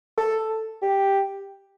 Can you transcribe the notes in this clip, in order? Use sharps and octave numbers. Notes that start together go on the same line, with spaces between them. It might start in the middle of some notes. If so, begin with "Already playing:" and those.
A4
G4